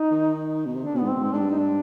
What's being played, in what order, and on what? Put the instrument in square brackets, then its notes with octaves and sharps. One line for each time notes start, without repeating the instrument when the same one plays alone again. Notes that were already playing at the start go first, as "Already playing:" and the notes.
Already playing: [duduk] D#4
[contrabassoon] D#3
B2
C3
[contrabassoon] D3 [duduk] D4
[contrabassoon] B2
[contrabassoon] G#2 [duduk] B3
[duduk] C4
[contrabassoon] B2
[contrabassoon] G#2 [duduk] C4
[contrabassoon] G#2 [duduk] D4
[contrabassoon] G2
[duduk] D#4
D4